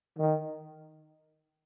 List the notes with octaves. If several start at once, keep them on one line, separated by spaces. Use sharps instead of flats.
D#3